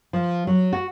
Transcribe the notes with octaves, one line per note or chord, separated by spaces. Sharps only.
F3
F#3
F#4